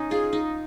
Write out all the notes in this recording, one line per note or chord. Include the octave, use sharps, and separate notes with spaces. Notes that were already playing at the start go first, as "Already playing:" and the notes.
Already playing: C#4 D#4
F4 G#4
D#4